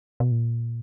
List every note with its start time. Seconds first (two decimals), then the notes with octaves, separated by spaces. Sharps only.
0.20 B2
0.32 A#2